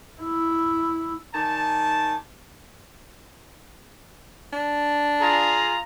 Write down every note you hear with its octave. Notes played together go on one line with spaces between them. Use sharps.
E4
D#3 D5 G#5 A5
D4
F4 G#4 A#5